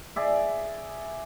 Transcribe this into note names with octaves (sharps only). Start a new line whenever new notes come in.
G#4 D5 E5